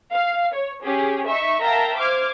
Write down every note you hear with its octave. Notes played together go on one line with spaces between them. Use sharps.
F5
C#5
C#4 G4 G#4
D#4 E5 C#6
A#4 E5 F5 G5 A5 A#5
C5 D6 F6 G#6